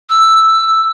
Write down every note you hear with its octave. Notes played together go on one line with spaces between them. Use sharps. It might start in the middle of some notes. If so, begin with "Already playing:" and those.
E6